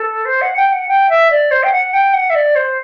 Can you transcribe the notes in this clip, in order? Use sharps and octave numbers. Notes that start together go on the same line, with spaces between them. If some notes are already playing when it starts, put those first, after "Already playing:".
Already playing: A4
C5
F#5
G5
F#5
G5
E5
D5
C5
G5
F#5
G5
F#5
E5
D5
C5